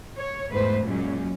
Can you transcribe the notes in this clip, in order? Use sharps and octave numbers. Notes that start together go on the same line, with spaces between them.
C#5
E2 G#2 A3 B4 C5
F#2 A#2 F#3 G#3 C#4